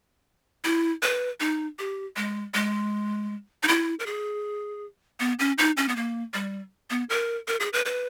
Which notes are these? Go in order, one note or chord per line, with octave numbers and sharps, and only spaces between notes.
E4
B4
D#4
G4
G#3
G#3
D#4
E4
A#4
G#4
B3
C#4
D#4
C#4
B3
A#3
G3
B3
A#4
A#4
G#4
B4
B4